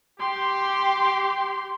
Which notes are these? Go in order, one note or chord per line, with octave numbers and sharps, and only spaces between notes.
G4 C6